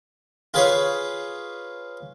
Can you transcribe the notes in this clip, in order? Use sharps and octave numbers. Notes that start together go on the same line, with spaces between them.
F4 G#4 B4 C#5